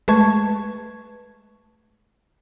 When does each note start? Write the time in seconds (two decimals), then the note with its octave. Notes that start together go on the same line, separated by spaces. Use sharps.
0.08 G#3 A3 B4 A5 C#6 G#6